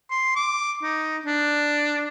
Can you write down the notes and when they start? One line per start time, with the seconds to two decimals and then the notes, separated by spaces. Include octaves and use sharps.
0.10 C6
0.36 D6
0.83 D#4
1.26 D4